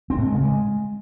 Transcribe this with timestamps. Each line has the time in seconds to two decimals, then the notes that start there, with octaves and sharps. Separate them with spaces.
0.10 C4
0.18 A2
0.26 G#3
0.35 C#3
0.43 G#3